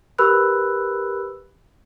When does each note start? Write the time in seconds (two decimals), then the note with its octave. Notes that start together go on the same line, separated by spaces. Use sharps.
0.18 G4 A#4 B4 B5 E6 F#6